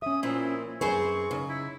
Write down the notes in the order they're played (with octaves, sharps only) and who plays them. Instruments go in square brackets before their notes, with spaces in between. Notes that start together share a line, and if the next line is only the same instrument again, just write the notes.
[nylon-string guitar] C#4 E5 [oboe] D#6
[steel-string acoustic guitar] A#2 F3 C4 [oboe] E4
[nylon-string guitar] F#2 B4 [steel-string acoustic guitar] C4 G#4 C5 [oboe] C#6
[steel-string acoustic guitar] C#3 [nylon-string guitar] D#4
[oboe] E4